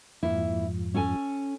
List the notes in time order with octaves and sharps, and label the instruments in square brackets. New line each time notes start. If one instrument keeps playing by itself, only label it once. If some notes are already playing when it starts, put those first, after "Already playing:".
[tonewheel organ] F2 G#2 F3 [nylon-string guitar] A#3 E4
[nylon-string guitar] C#4 A4 G#5